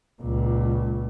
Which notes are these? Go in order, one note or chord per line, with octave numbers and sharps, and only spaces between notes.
C#2 A#2